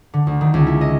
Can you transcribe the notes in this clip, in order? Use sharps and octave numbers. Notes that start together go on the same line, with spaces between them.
D3
D2
D#3
C#2
E4
D#5